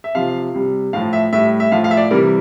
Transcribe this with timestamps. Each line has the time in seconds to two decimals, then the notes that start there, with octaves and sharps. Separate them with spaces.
0.04 E5
0.15 C3 F3 F5
0.54 C3 G3
0.93 A2 F3 F5
1.13 E5
1.33 A2 G3 E5
1.60 E5
1.72 A2 F3 F5
1.84 F5
1.91 E5
1.97 D5
2.11 C3 E3 G3 A#4